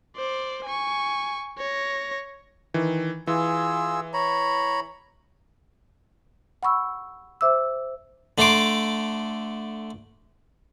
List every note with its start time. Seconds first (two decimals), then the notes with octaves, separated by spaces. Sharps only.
0.16 C5 D5
0.64 G#5 C#6
1.58 C#5 A#6
2.74 D#3 E3
3.27 E3 F4 G#4 E6
4.13 C#5 A#5 B5
6.63 F#5 B5 C#6 E6
7.41 C5 E5 D6 E6
8.38 D3 A3 A#5 C6 D6